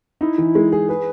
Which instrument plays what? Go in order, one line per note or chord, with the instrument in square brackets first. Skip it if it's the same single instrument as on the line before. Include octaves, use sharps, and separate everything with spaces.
[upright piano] D#4 [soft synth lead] E4
[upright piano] E3
G#3
G#4
[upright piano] G#4 [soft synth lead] B4